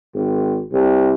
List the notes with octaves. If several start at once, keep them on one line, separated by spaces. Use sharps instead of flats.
G#1
C2